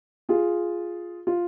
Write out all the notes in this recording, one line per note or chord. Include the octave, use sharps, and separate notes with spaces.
F4 G#4
F4